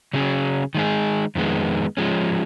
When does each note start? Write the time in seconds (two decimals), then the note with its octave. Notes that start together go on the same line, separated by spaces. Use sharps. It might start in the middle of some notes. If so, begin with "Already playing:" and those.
0.13 C#3 F#3 C#4 G#4
0.75 D#3 G#3 D#4 G#4
1.35 F2 D#3 G#3 B3
1.97 F3 G#3 C#4